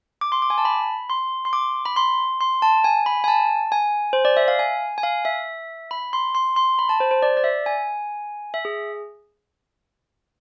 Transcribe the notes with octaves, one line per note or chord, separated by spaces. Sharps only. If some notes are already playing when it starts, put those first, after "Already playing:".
D6
C6
D6
G#5
A5
B5
C6
C6
D6
B5
C6
C6
A5
G#5
B5
G#5
A5
G#5
C5
D5
E5
F5
G#5
G#5
F5
E5
B5
C6
C6
C6
B5
A5
C5
C5
D5
D5
E5
G#5
E5
G#4